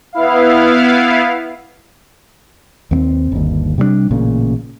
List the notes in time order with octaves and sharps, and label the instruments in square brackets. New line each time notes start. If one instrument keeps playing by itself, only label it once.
[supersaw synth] B3 E4 F5
[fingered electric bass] D#2 A#3 C4
G1 D#2
C3 G3 A3 D4
A1 A#2 C#3